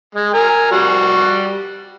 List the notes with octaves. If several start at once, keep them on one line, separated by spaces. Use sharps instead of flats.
G#3
A#4 G#5
G3 F#4